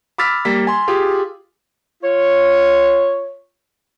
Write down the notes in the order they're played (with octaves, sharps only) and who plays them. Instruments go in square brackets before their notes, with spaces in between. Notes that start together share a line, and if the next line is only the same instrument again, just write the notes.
[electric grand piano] B5 D6 E6 F6 A6 B6
G3 A#3 B6
G#5 C6
F4 G4 G#4
[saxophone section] F4 C#5